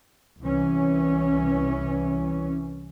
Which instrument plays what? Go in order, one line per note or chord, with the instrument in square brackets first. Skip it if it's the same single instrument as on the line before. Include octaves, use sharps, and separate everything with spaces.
[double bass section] C2 E3 C#4